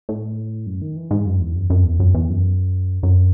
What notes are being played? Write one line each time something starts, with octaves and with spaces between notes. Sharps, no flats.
A2
F#2
D#3
E3
G#2
F#2
E2
F#2
F#2
E2
F#2
E2
F#2
F#2